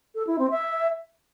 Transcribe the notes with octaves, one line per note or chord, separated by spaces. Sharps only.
A4
E4
C4
E5